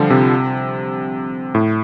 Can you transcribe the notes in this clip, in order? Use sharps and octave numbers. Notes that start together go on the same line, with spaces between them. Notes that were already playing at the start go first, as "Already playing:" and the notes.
Already playing: D3 F3 G3
C3
A2